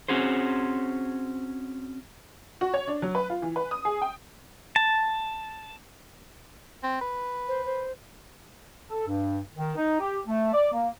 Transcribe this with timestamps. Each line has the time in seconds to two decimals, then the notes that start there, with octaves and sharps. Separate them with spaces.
0.08 C4 C#4 F#4 G#4 C5
2.61 F#4
2.74 C#5
2.88 D4
3.02 F#3
3.15 B4
3.30 F4
3.42 E3
3.56 B4
3.71 D#6
3.85 G#4
4.02 G5
4.76 A5
6.83 C4
7.01 B4
7.48 C5
7.65 C5
8.89 A4
9.07 G2
9.56 D#3
9.76 D#4
9.99 G4
10.26 A3
10.53 D5
10.72 A#3